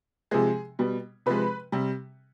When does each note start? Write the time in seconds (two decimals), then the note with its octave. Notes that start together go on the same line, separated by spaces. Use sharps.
0.31 C3 F3 G#3 G#4
0.79 B2 G3
1.26 C3 F3 G#3 B4
1.72 C3 G3